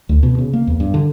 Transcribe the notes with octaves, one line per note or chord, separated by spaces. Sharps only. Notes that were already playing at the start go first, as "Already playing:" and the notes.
D2
B2
C#3
A#3
E2
G2
D3